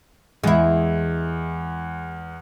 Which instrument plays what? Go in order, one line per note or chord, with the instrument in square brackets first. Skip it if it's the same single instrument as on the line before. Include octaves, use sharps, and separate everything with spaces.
[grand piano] E2 [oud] G#3 E4